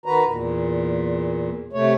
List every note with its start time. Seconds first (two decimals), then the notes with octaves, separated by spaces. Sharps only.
0.06 D#3 F#4 B4 A#5
0.26 E2 A#2
1.73 C3 A3 C#5